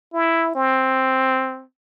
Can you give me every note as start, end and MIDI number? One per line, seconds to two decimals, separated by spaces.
0.14 0.51 64
0.55 1.64 60